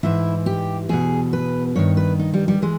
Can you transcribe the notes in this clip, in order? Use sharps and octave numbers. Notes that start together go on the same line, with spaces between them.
G#2 E3 E4
G4
E2 B2 G#4
B4
G2 D#3 C#5
B4
D#4
G3
G3
E3 G#3